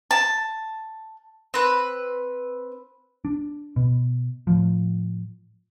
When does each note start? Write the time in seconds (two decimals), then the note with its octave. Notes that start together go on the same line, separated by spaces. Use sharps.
0.11 A5
1.54 C4 B4
3.25 D4
3.76 B2
4.47 A2 F3